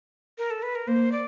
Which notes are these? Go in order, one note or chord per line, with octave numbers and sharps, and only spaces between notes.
A#4
A4
B4
A#4
A#3 C5
D5